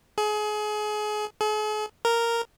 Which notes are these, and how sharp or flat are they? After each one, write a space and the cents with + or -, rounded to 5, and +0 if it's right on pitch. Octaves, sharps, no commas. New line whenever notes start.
G#4 +30
G#4 +45
A#4 -5